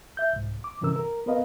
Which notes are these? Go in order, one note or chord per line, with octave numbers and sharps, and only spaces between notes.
E5 G6
C2 G#2
D6
G2 C3 E3 C#4 A#4 E6
A#4
B3 C4 A#4 B4 D#5 F5